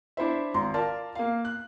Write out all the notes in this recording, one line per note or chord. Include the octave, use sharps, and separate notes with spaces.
D4 E4 C5 E5
G#1 A#5 C6
F4 A#4 D5 A5
A#3 F5
F#6